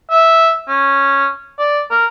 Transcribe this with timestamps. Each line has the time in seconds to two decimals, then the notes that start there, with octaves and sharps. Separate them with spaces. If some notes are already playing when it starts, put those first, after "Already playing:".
0.10 E5
0.68 C#4
1.58 D5
1.91 A#4